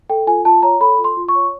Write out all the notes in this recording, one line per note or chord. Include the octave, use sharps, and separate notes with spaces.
A4 G5
F4 G#5
F4 A5
C#5 A#5
A4 B5
F4
C6
F4
C#6
C#5